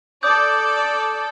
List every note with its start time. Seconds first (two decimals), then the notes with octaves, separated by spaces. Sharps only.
0.23 A4 D5 D6 D#6 G6